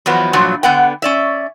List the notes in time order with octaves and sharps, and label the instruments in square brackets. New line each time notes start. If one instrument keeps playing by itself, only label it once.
[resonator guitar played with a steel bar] E2 F3 F#3 B3
G2 A#2 F3 F#3
D3 B3 F#5 G5
C#4 D5 E5